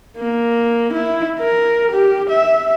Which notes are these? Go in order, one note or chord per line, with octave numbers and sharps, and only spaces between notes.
A#3
E4
A#4
G4
E5